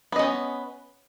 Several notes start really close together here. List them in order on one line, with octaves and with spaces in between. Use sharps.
B3 D#5 C#4